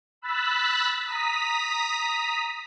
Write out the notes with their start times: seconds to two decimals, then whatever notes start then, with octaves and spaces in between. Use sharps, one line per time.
0.22 B5 E6 F#6 A6 B6
1.06 A#5 D#6 B6